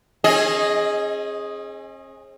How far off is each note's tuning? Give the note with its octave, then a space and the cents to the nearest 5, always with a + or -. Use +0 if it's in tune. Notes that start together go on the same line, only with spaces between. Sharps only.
C#4 -45 G#4 +0 D#5 +0